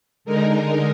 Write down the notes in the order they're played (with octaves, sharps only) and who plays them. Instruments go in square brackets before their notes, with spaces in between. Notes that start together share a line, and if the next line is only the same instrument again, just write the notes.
[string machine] D3 G#3 D#4 A#4